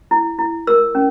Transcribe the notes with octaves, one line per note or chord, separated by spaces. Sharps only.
E4
E4
A#4 E6
C#4